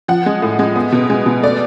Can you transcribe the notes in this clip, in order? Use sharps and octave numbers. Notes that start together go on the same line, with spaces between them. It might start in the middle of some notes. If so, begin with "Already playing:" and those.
F3 F#5
G#3
A2
G#3
B3
B2
G#3
B2
A3 D5